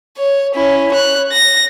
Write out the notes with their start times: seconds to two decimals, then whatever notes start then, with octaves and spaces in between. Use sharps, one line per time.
0.17 C#5
0.55 C#4 E4
0.92 C#5 F#6
1.32 A#6